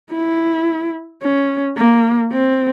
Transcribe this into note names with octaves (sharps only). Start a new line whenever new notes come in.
E4
C#4
A#3
C4